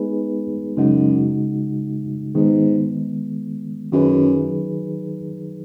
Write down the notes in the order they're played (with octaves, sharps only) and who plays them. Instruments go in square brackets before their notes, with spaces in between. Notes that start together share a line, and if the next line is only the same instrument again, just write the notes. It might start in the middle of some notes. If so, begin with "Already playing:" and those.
Already playing: [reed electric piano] G#3 B3 D#4 G#4 B4
[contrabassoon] F#2 [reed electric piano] C#3 G#3 D#4 F#4
[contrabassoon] G#2 [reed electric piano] D#3 G#3 B3
[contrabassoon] F#2 [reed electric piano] D#3 F#3 D#4 G#4 B4